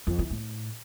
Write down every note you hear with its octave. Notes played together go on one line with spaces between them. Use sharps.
F2
E3
A2